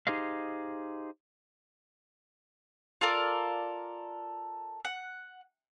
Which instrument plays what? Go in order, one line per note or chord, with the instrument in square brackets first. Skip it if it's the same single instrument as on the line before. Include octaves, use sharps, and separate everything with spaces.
[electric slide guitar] D#4 G4 G#4 C5 D#5 F5
[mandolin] F4 A4 A#4 D5
F#5